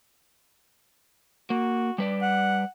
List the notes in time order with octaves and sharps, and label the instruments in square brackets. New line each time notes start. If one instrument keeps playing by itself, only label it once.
[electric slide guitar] A#3 [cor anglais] F#4
[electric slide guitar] G3 B4 D5
[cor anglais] F#5